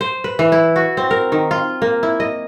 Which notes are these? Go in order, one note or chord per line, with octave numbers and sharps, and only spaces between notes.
C5
B4
E3
E4
F#4
C4
A#4
D#3
F4
A#3
E4
D#5